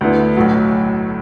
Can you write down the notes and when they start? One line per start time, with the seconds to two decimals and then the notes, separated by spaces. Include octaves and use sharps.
0.01 D2 D3 B3 E4
0.37 B1 A2 F#3